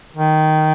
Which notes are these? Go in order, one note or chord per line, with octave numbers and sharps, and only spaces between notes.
D#3